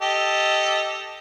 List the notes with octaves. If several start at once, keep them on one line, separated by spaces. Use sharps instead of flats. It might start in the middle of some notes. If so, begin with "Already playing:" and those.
G4 A4 D#5